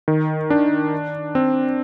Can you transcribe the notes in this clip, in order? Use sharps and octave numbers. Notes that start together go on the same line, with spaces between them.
D#3
D4
C4